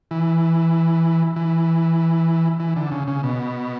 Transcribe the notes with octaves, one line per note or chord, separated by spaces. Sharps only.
E3
E3
E3
D3
C#3
C#3
B2